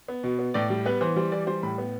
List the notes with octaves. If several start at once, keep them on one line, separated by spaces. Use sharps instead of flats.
B3
B2
B3
A2 D5
G3
B3 B4
E3 C5
G3 C5
E3 D5
G3 C5
A2 B5
B3